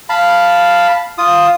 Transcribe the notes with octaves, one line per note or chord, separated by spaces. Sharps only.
F5 A5 B5
F4 D#6